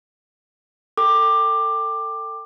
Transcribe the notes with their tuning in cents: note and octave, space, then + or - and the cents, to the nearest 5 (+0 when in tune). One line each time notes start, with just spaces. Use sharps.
A4 +25 G5 +0 D6 +15